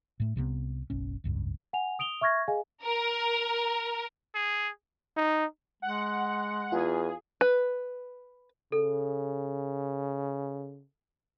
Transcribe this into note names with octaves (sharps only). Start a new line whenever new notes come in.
A2 A3
C2 C3 D#3 B3
F#1 B1 C#4
F1 C#2 G2
F#5 G#5 F7
D#6 D7 F7 G7
E5 C#6 F6 G#6 A#6
G#4 D#5 F5 G#5
A#4
G#4
D#4
G#3 F#5
E2 F4 G#4
B4
C#3 A4